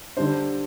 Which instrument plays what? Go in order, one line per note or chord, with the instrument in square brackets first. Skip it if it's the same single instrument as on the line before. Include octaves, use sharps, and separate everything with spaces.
[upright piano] D3 G3 D4 C5